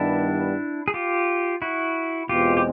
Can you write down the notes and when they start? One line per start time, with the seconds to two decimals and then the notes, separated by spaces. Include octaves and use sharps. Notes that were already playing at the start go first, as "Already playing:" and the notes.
Already playing: G2 D#3 G3 B3 D4 E4
0.88 G#4
0.94 F4 G4
1.62 E4 F#4
2.29 E2 B2 G#3 C4 F4 G4
2.57 G4